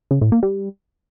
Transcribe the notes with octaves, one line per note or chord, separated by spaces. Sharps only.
C#3
A2
A#3
G3